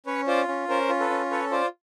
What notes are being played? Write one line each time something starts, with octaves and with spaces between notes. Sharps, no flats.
C#4 B4 C#5
F4 C5 D5
C#4
C#4 A#4 C5
F4
A4 B4
C#4
A4 B4 C#5
F4 C5 D5